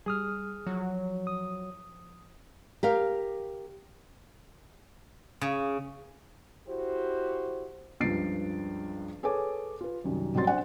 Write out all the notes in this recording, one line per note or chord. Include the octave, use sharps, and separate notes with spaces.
G3 G#4 D#6 F6
F3 F#3
D#6
G4 A#4 F5
C#3
E4 F#4 G4 C5
C#2 G2 F3 A6 C7 D7
G#4 A4 B4 C#5 G#5 D6
F4 B4
C2 F#2 D#3
A1 F#3 G3 C4 C6 A6
D4 C5 F#5 G#5